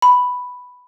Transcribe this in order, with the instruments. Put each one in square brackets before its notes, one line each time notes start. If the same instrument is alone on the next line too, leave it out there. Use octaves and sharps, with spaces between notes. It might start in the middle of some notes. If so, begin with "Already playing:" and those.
[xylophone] B5